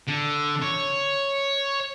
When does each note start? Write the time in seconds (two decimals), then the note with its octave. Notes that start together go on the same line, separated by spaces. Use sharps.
0.07 D3
0.62 C#5